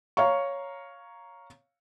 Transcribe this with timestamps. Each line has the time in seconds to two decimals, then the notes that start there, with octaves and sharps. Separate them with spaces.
0.17 C#5 F5 A#5 C#6